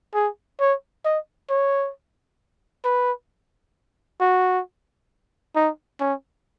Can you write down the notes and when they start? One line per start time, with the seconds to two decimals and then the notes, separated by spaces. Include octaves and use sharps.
0.14 G#4
0.60 C#5
1.05 D#5
1.50 C#5
2.85 B4
4.20 F#4
5.55 D#4
6.00 C#4